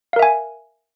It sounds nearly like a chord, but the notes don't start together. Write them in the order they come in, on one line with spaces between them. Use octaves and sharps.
F5 A#4 E5 G#5